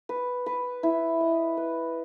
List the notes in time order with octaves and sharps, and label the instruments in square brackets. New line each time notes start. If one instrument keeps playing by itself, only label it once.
[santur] B4
B4
E4
D#5
B4